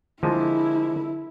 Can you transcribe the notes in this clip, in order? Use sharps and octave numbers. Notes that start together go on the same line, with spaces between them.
D3 F3 G#3 A#3 E4